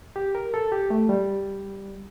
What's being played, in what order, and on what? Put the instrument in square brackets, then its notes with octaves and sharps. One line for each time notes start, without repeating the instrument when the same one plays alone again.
[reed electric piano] G4
A#4
A4
G4
A3
G3